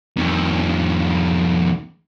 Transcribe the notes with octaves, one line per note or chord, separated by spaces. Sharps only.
F2 D#3